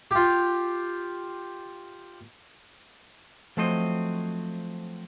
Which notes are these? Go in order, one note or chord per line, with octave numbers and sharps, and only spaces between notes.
F4 G4
F3 F#3 A3 C4 C5 D#5